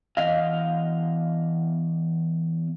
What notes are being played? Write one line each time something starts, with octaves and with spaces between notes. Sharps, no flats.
E2 D#5 F5